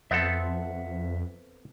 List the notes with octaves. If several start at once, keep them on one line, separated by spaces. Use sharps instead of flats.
F2 B3 C4 A4 E5 F#5